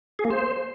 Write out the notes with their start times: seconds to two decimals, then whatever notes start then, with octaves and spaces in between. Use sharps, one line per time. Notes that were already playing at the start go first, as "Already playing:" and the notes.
0.19 G#4
0.25 A#3
0.31 C5